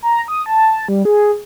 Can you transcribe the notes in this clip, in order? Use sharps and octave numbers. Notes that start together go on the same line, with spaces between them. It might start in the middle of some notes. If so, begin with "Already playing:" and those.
A#5
D#6
A5
G3
G#4